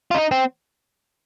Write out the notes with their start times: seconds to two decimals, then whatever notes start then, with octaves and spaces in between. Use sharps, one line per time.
0.11 F4
0.15 D#4
0.31 C4